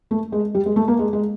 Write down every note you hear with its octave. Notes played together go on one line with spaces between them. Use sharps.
A3
G#3
G3
G#3
A3
A#3
G#3
G#3